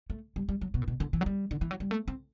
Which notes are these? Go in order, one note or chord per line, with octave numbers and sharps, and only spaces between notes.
A3
G3
G3
F#3
B2
A2
B2
D3
E3
F#3
G3
D3
E3
F#3
G3
A3
C4